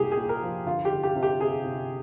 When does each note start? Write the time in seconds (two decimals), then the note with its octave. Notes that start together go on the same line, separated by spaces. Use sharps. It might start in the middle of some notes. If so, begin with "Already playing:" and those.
Already playing: C2 A#2 A#3 G4 G#4
0.12 G#4
0.17 A#2
0.29 A#4
0.42 F3
0.66 G1 F4
0.85 G4
0.92 G1
1.03 G4
1.16 C3
1.23 G4
1.40 C3 G#4
1.65 C3